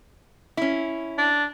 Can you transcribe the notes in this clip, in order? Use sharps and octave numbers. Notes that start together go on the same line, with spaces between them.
C#4 E4
D4